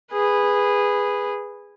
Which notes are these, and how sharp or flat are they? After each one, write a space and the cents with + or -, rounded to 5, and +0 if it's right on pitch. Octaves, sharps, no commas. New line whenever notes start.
G#4 -15 B4 +0